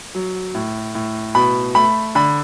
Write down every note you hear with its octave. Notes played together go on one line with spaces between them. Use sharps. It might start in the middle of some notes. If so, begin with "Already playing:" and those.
F#3
A2
A2
B2 B5
A3 B5
D3 B5